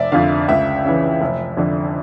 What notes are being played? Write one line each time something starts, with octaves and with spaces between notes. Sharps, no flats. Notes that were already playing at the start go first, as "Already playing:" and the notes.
Already playing: F1 D5 E5
F2 D3 F5
C#2 E5
C#3 E3
F1
F2 D3